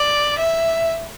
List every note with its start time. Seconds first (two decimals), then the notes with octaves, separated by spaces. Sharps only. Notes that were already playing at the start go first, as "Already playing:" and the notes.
Already playing: D5
0.39 E5